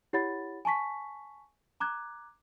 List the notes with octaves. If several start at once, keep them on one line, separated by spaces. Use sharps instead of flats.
E4 G4 C#5 F#5 B5 A6
G#5 A5 C#6 B6
A#5 D6 F#6 G#6